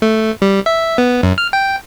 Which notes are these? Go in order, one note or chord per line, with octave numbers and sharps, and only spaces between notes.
A3
G3
E5
B3
F#2
F6
G5